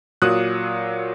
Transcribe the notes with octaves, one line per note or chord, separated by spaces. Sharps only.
A#2 F#3 D#6 F#6